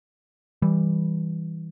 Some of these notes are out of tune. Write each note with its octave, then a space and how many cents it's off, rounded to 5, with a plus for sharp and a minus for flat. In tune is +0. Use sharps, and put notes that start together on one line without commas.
E3 -15 G3 +0